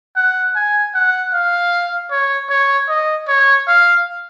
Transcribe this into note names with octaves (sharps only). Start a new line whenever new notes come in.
F#5
G#5
F#5
F5
C#5
C#5
D#5
C#5
F5